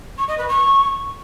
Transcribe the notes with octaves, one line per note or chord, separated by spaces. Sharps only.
C#6
D#5
B4
C#6